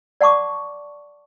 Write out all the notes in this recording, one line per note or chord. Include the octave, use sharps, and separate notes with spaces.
D5 F#5 A5 C#6 D6